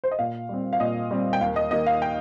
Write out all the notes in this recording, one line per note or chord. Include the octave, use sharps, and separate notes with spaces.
C5
D#5
A#2 F5
G3 C4
F5
A#2 D#5
G3 C4
G5
D#2 F5
D#5
D#3 A#3 D#5
F5
G5